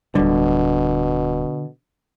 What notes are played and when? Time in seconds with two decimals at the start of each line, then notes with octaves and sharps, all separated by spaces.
0.15 D1 B2 D3 G3